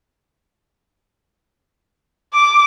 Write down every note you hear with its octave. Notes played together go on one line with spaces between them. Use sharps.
D6